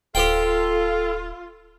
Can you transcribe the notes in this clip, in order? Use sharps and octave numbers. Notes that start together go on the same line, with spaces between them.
D1 F4 G4 A4 C5 G5